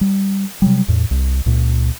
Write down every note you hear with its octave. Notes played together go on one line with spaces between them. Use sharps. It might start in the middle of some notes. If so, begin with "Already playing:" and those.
G3
C3 F#3 G3
E2 A2
C2
C#2 A#2